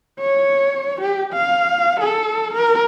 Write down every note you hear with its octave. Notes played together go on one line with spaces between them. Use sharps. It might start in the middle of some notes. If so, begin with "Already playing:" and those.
C#5
G4
F5
A4
A#4